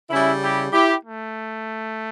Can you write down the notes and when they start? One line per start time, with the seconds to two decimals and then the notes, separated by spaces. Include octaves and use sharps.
0.10 C#3 G3 C#4 E4
0.41 E4 G4
0.72 E4 G4
1.03 A3